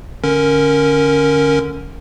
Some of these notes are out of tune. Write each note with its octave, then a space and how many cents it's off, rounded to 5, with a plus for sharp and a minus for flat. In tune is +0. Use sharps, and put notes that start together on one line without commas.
D3 +0 C#4 +0 A#4 +0